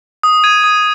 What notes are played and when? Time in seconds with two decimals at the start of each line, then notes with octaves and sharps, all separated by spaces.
0.23 D#6
0.44 G#6 D#7
0.64 D#6